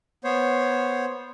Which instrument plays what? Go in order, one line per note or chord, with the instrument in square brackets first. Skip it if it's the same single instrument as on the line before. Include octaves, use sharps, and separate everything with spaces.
[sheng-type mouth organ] B3 C5 C#5